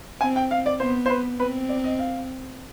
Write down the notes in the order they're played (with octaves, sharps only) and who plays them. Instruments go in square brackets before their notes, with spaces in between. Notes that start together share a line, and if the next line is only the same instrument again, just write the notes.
[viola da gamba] C4 [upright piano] G#5
[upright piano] G5
F5
D5
[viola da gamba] B3 [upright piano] C5
[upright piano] C5
B4
[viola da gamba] C4 [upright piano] B4
[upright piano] D5
D#5
F5